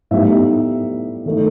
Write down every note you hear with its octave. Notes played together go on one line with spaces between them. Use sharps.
A2 G3 B3 D#4 E5
D#3 A3 D#4